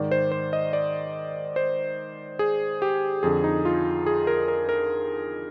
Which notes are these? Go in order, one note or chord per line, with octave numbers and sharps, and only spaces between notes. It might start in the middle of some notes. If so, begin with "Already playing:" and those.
Already playing: G#2 D#3 D5
C5
C5
D#5
D5
C5
G#4
G4
F2 D3 G#4
D#4
F4
G#4
A#4
A#4
A#4